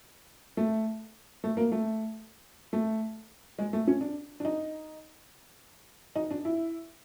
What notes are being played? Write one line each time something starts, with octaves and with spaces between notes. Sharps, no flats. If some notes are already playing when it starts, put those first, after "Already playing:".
A3
A3
A#3
A3
A3
G#3
A3
C#4
D4
D4
D#4
D#4
D4
E4